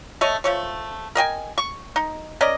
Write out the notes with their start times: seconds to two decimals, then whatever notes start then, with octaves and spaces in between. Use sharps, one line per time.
0.21 A3 C#5 D#5
0.44 F3 A3 C#5
1.15 A#4 D#5 G5 G#5
1.58 C#6
1.96 D#4
2.41 C#4 A#4 D5 D#5